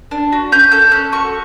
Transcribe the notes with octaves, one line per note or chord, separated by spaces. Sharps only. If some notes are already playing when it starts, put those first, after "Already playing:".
D4
F#4
C#4 G6
A4 G6
C#4 F#6
F#4 C#6